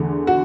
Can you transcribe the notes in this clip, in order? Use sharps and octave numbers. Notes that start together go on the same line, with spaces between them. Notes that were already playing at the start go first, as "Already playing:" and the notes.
Already playing: E2 D3 A3
F#4